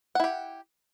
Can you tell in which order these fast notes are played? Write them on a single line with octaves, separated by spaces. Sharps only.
F#5 E4 G4